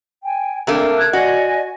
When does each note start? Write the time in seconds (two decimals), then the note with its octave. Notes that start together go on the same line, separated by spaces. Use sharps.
0.23 G5 G#5
0.67 C3 A3 A#3 D4
1.00 F#6 G#6
1.13 F#4 D5 D#5 G#5